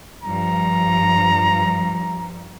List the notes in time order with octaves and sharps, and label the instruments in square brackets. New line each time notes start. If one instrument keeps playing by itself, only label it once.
[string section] G2 F3 [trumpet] A#5